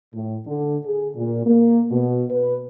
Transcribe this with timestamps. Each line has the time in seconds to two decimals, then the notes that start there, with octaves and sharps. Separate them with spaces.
0.14 A2
0.46 D3
0.84 G#4
1.15 A#2
1.46 A#3
1.91 B2
2.30 B4